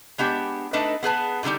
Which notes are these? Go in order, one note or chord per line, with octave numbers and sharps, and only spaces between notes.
G#3 B3 D4 G4
A3 D4 D#4 A4 B4 D#5
B3 G#4 B4 A5
B2 D3 G3 D#4 G4